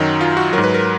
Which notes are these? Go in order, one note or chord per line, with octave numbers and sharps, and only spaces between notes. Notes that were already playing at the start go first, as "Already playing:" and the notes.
Already playing: F#2 D#3 F#3 D#4
F4
F#4
F#3 A#4
G#2
B4
A#4